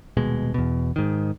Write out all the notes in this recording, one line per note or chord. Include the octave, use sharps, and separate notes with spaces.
D#1 B2 G#3
E2 B2
G#2 D#3